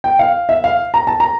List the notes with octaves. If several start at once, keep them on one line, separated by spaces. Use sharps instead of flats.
G5
F5
E5
F5
A#5
A5
A#5